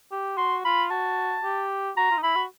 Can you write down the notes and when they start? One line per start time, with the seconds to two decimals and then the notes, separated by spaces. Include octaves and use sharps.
0.11 G4
0.37 F#4 C6
0.65 F4 B5
0.90 F#4 A5
1.43 G4
1.97 F#4 A#5
2.11 F4
2.17 D#4
2.23 E4 B5
2.36 F#4